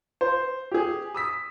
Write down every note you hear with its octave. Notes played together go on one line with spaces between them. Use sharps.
C5
G4 G#4
D#6 E6 B6